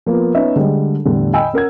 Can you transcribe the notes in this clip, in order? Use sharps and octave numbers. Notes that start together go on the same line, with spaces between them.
F3 A#3 B3 F4
B3 C#4 D#4 C#5 E5
D3 G3 G#3
E2 A2 D3 G3
D#5 G5 G#5 B5 E6
C#4 A#4 F#5 G#6